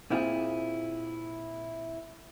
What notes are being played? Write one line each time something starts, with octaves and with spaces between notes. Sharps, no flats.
A#2 C4 E4 F4 G#4